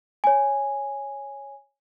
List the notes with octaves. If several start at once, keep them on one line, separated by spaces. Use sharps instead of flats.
C#5 G#5